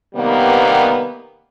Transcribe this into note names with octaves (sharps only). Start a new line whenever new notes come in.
C3 D#3 G3 A#3 B3